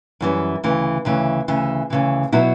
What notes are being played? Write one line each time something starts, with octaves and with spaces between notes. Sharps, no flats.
F#2 E3 G3 C#4
D2 C#3 E3
D2 C#3 E3
D2 C#3 E3
D2 C#3 E3
B2 F#3 B3 E4